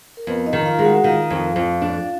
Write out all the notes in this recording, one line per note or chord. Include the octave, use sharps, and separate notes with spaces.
A#4
F2 B3 B4
D#4 D#5
D#3
F4 F5
G#3
F#4 F#5
D#3 F4 F5
F2
F2
D4